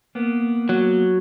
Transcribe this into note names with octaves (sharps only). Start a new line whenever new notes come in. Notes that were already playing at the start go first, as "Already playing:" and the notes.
A#3 B3
F#3